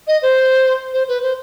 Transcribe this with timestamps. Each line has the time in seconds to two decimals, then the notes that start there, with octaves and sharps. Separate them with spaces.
0.07 D#5
0.22 C5
0.93 C5
1.08 B4
1.22 C5